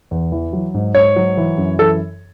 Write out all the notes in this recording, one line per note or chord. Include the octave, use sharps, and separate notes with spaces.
E2
E3
F#3
G#2
G#2 C#5
F#3
E3
F#2
E3 A4